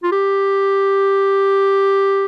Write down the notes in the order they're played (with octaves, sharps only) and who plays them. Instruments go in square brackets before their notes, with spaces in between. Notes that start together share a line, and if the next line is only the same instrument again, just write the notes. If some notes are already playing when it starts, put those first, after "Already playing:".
[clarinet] F4
G4